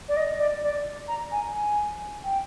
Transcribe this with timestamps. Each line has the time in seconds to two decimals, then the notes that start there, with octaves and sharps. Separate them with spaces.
0.08 D5
0.16 D#5
0.38 D5
0.62 D5
1.07 A#5
1.31 G#5
1.54 G#5
2.24 G5